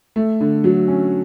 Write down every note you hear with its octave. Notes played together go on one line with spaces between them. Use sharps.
A3
D3
F#3
C#4